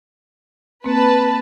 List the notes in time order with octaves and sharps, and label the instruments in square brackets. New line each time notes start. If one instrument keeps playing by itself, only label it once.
[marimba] A#3 C4 [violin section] B4 A5